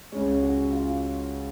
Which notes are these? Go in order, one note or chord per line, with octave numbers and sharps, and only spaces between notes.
C#2 C#3 G#3 C#5
F#4
F4